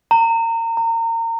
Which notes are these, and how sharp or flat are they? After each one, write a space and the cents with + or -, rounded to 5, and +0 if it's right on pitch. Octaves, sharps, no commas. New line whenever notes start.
A#5 -30
A#5 -30